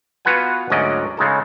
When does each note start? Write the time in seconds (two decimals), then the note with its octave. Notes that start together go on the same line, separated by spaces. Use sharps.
0.25 B3 F4 F#4 B4 F#5 G#5
0.70 D2 G#2 F#3 C#4 D5 D#5
1.17 C#3 G#3 D#4 A4